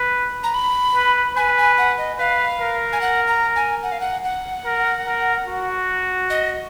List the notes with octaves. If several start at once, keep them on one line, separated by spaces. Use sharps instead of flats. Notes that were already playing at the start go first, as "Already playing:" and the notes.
Already playing: B4
A#5
B5
B4
B4 G#5
G#5
F#5
D#5
B4 F5
A#4
G#5
F#5
A#5
G#5
F#5
F5
F#5
F#5
A#4
A#4
F#4
D#5